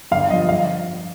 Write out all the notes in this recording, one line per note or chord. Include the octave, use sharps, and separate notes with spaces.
G1 F5
G2 F3 D#5
F5